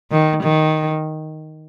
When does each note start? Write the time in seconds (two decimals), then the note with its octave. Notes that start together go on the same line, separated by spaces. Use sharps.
0.11 D#3
0.43 D#3